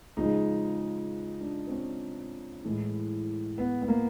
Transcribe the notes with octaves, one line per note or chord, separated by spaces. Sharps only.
C#3 F3 G#3 D#4
D4
C4
C#4
A2 E3 G#3
B3
B3
A#3